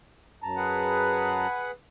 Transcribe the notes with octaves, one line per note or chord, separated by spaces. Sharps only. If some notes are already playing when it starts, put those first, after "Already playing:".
F#2 A5 A#5
G#4 B4 F#5